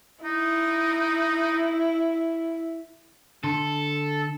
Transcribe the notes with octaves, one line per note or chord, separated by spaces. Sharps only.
D#4 E4
D3 A4 C6